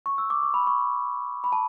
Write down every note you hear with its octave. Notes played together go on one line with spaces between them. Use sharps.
C#6
E6
D6
C#6
B5
C#6
B5
A5